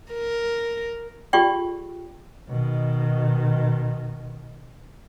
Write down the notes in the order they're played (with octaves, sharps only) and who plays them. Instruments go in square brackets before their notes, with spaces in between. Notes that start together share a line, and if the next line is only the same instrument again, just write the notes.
[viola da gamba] A#4
[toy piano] F4 G4 G#4 D5 G5 C#6
[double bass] B2 D#3